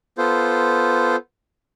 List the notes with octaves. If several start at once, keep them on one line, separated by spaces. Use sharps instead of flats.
B3 F4 A4 C5